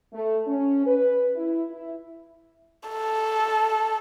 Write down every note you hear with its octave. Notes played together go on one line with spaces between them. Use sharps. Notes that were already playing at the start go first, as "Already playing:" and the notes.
A3
C#4
B4
E4
E4
A4